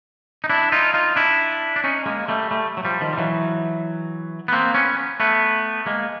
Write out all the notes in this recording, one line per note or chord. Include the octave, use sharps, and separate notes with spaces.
D#4
D4 E4
D#4 F4
D#4 F4
D4 E4
D4
C#4 D#4
G#3 A#3
G3 A3
G3 A3
F#3
F3 G3
D#3 F3
G3
E3 F#3
B3
A#3 C4
B3 C#4
A3 B3
G#3 A#3